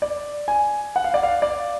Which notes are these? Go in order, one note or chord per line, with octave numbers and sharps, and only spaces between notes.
D5
G#5
F#5
F5
D5
F5
D5